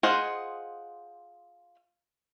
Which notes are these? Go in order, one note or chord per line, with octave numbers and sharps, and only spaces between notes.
F4 G#4 C5 D#5 F#5